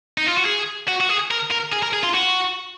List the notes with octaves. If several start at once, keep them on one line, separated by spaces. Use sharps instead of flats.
D#4
F4
F#4
G#4
F#4
F#4
G#4
A#4
A#4
G#4
A#4
G#4
F4
F#4